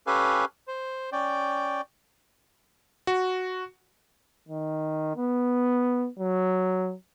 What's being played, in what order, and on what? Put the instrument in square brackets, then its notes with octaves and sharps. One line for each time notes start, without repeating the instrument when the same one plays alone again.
[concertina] C#4 G4 A4 B4 F5 G#5
C5
C#4 D5 G5
[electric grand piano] F#4
[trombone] D#3
B3
F#3